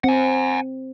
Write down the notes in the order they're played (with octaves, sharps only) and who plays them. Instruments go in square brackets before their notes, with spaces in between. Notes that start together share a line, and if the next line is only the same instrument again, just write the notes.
[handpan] C4 [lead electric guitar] F#5 G#5